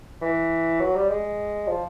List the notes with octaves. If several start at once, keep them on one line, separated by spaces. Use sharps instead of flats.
E3
F#3
G3
G#3
F3